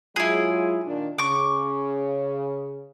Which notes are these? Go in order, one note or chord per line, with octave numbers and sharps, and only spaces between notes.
F#3 G#3 E4 F4 G#4
A#2 D#3 D4
C#3 C#6 D6